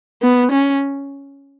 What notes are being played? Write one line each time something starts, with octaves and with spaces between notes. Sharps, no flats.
B3
C#4